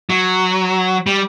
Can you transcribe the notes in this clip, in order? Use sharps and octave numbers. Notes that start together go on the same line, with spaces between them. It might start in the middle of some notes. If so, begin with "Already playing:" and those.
F#3
G3